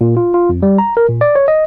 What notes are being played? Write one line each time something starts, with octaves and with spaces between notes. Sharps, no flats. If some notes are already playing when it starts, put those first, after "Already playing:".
A#2
F4
F4
F2
G3
A#5
A#4
A#2
D5
C#5
D#5